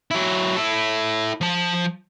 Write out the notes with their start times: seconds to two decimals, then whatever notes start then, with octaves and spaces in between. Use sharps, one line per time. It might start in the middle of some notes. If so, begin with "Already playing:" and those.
0.11 F#3 E4
0.56 E4 A4
1.41 F3 A5